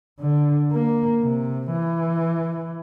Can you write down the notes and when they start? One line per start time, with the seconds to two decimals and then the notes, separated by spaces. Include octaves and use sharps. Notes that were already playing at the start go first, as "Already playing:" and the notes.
0.20 D3
0.72 A#3
1.22 C3
1.71 E3